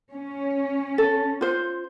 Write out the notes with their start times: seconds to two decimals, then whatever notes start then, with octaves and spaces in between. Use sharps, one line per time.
0.13 C#4
0.98 A4
1.41 F4 C5